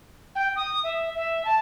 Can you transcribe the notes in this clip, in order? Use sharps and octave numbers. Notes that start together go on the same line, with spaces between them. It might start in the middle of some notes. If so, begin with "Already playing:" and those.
G5
D#6
E5
E5
A5